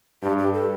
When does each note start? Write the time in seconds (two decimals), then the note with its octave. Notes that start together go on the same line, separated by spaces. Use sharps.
0.23 G2 G4
0.38 G4
0.53 A4